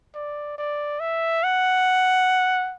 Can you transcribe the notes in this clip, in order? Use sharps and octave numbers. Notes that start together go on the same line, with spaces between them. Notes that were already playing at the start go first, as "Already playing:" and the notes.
D5
D5
E5
F#5